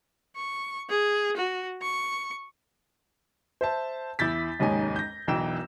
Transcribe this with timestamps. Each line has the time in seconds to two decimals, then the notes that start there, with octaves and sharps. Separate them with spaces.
0.36 C#6
0.90 G#4
1.37 F#4
1.82 C#6
3.61 C5 E5 A5
4.19 E2 E4 G6 A6 B6
4.59 F1 D#2 G#2 C#4 D#4 G#5
4.96 G6 A#6
5.27 E1 B1 E3 G5 E6 E7